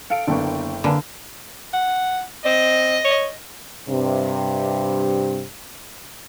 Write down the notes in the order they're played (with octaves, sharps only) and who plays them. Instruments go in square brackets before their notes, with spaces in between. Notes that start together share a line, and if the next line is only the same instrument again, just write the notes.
[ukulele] A4 F5 G5 [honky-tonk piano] C#7 D7
[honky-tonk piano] F#1 G5 C#6 [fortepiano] D3 A#3 B3 [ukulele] A4
[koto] D3 [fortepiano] A#3 B4 G#5
[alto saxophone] F#5
[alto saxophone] C4 [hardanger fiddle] D#5
[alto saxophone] C#5
[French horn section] G2 C3